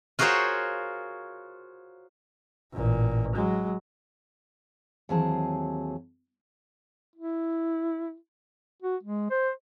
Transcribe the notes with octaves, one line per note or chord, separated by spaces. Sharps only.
F4 F#4 G#4 A#4 C5 C#5
A1 A#2
F#3 G#3
D#2 E3 F#3 C4 G#4 A5
E4
F#4
G#3
C5